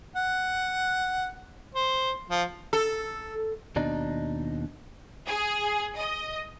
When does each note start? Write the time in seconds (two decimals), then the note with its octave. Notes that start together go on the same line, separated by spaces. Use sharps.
0.16 F#5
1.75 C5
2.30 F3
2.73 A4
3.76 D#2 B2 D4 D#4
5.27 G#4
5.95 D#5